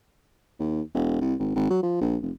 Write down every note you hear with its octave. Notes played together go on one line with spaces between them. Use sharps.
D#2
E1
C2
G#1
G#1
F#3
F3
A#1
F1